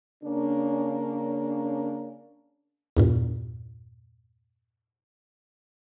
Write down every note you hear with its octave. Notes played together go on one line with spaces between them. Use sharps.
C#3 A#3 C#4 D4
E2 G2 A#2